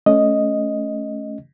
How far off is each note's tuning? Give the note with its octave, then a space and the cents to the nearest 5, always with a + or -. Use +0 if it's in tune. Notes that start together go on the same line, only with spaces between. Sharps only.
A3 -25 C#4 +0 D#5 +0